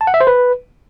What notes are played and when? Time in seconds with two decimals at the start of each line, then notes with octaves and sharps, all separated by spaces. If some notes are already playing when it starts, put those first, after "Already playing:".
0.01 A5
0.07 F#5
0.14 E5
0.21 C5
0.27 B4